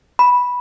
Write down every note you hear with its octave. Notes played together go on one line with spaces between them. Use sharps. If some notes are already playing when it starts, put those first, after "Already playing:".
B5